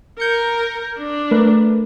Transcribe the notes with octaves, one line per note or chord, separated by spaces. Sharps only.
A#4 G6 C#7
D4
A3 A#4 B4